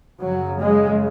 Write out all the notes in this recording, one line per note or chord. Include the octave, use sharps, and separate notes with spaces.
F#2 C#3 F#3
G#3